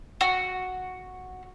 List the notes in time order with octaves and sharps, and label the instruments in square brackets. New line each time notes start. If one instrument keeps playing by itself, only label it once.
[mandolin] F#4